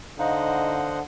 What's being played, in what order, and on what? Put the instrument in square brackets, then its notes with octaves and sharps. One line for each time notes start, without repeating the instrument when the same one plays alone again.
[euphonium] D3 [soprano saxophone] D#4 [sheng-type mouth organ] C5 D#5 F#5 [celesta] F5